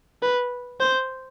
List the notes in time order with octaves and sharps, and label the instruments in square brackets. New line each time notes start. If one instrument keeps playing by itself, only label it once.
[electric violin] B4
C5